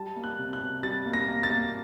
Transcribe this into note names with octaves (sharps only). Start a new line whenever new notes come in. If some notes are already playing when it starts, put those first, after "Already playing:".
Already playing: G3 A5
A#3
F#6
C3
F#6
C3
G3 A6
A#3
A#6
A#3
A6
A#3